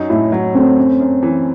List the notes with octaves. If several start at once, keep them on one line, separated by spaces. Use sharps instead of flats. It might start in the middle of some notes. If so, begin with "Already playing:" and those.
Already playing: F#2 F#3 D#4
A2 E4
F#3
A3 C4
F#2
F#2
E3